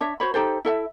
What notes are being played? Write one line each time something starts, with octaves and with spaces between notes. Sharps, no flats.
D4 C#5 E5
F#4 C5 C#5 B5
D#4 G4 A4 C5
E4 A4 E5